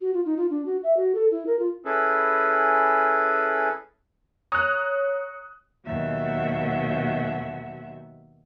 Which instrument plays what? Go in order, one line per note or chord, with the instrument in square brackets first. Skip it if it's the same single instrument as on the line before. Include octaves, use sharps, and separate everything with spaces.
[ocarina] F#4
F4
D#4
F4
D4
F#4
E5
F#4
A4
E4
A#4
F4
[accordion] C#4 E4 G#4 A4 B4
[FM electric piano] C#5 A#5 C#7 [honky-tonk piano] D#6 F#6
[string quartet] D#2 B2 F#3 F#4 E5